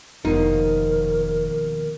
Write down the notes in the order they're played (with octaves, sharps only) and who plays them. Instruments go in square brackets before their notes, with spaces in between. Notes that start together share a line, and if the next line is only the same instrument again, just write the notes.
[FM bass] F1 [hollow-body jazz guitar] D#2 B2 F3 [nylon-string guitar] D#4 [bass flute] A#4